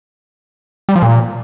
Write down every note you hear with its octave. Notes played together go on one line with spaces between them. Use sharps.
G3
F3
A#2